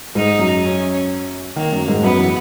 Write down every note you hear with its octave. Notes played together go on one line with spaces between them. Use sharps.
G#2 G#3 D#4
F#2 F#3
C#4
D#3 A#3
F#2 F#3
G#2 G#3
F#2 F#3 B3
E3